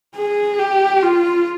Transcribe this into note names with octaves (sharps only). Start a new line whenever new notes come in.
G#4
G4
F4